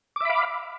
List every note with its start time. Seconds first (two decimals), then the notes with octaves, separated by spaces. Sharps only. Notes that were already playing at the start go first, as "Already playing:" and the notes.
0.16 D6
0.21 E5
0.25 B5
0.30 F5